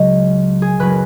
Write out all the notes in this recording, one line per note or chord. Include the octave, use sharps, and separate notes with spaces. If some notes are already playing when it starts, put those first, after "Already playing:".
Already playing: C#2 C#3 F#3 D#5
G#4
F#1 F#3 B4